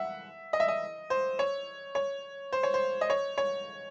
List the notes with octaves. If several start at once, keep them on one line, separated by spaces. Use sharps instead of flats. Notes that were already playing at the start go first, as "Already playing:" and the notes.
Already playing: E5 F#5
D#5
E5
D#5
C5
C#5
C#5
C5
C#5
C5
D#5
C#5
C#5